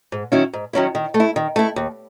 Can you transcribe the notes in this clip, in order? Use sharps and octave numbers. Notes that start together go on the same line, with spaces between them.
G#2
D#3 F#3 C#4 E4
G#2
D#3 F#3 C#4 E4
D#3
A3
E4
D#3
A3 E4
D#2